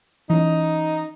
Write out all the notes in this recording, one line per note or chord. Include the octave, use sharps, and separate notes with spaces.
E3 C#4 D#4